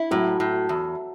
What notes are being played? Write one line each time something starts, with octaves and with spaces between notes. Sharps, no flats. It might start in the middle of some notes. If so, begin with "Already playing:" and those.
Already playing: E4
A2 F#3
A2
E2